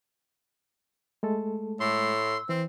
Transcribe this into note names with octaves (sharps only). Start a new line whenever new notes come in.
G#3 A3 A4
A2 C6 E6
E3 C4